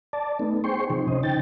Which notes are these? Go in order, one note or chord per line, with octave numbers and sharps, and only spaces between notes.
D5 A5
A3 B3 D#4
G#4 C5 G5 C6 C#6
C3 F3 D#4
C#4 C5 D#5
C#3 D#4 G5 A6